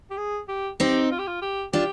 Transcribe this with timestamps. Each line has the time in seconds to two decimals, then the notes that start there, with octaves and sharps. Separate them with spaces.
0.11 G4
0.17 G#4
0.48 G4
0.80 C4 D#4 G4
1.11 F4
1.19 G4
1.27 F4
1.42 G4
1.73 D4 F4 G4